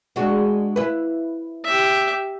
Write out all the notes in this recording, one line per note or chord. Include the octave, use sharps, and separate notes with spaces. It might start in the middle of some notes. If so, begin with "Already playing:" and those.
G#3 D4 F#4
E4 B4
G4 E5